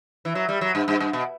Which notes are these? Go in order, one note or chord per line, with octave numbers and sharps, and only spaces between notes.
E3
F#3
G3
F#3
G2
G2
G2
B2